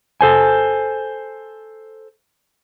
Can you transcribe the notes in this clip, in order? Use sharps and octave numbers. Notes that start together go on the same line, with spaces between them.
A4 C5 G#5